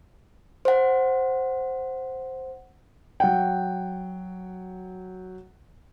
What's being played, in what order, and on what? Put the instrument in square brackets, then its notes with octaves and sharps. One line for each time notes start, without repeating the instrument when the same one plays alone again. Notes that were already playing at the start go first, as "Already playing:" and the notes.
[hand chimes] C5 F#5
[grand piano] F#3 F#5 G5